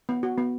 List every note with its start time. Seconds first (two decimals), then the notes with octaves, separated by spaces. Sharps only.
0.09 B3
0.23 F#4
0.38 B3